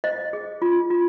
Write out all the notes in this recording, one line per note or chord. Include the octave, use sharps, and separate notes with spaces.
C5 D#5
G#4
F4
F4